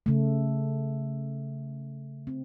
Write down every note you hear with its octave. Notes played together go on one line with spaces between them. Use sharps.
C#3 A3
C4